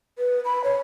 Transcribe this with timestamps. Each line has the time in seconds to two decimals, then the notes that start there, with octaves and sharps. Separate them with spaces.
0.19 B4
0.45 B5
0.64 C#5